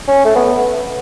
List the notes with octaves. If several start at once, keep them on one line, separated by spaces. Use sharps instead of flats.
C#4
A3
B3